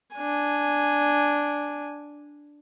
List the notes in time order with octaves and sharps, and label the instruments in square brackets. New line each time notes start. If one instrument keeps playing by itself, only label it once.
[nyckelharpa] D4 G#5